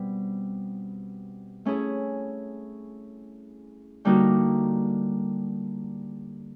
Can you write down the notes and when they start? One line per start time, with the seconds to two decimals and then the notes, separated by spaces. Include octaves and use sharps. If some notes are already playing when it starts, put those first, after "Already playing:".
Already playing: B2 G3 C4
1.65 A3 C#4 E4 G#4
4.05 D3 G3 A#3 D#4 F#4